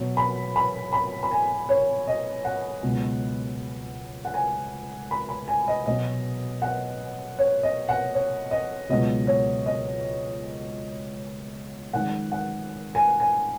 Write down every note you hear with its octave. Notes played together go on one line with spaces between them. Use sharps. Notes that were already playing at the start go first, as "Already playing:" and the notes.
Already playing: B2 F#3 B3
B5
B5
B5
B5
G#5
C#5
D#5
F#5
C#2 B2 F#3 B3
F#5
G#5
B5
B5
G#5
D#5
B2 F#3 B3 D#5
F#5
C#5
D#5
F#5
C#5
D#5
C#2 B2 F#3 B3 D#5
C#5
D#5
F#2 D#3 G#3 F#5
F#5
G#5
G#5